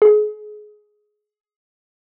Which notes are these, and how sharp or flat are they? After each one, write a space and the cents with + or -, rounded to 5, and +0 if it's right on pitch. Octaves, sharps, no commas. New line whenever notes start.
G#4 +20